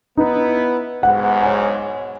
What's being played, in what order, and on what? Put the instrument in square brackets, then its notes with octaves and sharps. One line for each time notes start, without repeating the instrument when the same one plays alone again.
[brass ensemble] B3 E4 B4 [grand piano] D#4
[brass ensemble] B1 G#2 [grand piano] F#5
[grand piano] C#5 G#5